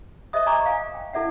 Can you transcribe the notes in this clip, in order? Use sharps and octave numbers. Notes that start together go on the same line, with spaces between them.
C5 D#5 E5 D#6
D5 G#5 A#5 C#6 D6
F5 G#5
G5
E4 A4 D5 E5 F#5